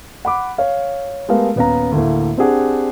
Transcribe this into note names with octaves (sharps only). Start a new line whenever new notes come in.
F#5 B5 D6
C#5 F5
G#3 A3 B3 G4 A#4 F5
D#1 B3 C#4 F5 A#5
D2 A2 A#3
C4 D4 G4 G#4 F#5